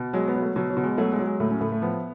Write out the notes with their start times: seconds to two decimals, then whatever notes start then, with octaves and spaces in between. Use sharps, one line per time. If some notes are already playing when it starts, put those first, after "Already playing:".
Already playing: B2
0.13 F#3 G#3
0.28 B3
0.35 F#3
0.42 A3
0.56 B2 F#3
0.70 F#3
0.77 B2
0.83 G#3
0.98 F#3 A3
1.12 G#3
1.19 F#3
1.26 G#3
1.40 A2 A3
1.51 C#4
1.61 A2 A3
1.72 A3
1.82 F3 B3